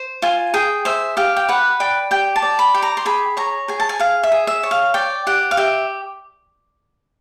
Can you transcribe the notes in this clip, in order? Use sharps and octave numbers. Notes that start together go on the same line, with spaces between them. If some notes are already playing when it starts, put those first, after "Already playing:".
Already playing: C5
F4 G#5
G#4 G5
C5 E5
G4 F5
G5
B4 F#5
D5 G5
G4 G5
A5
D5
B5
G4
A#5
C6
G#4 B5
C#5 A#5
G#4 G#5
A5
G#5
G#4 F5
E5
G#4
E5
C#5
F5
D5 G5
G4 F#5
F5
G4 E5